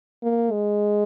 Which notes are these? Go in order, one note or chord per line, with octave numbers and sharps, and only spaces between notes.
A#3
G#3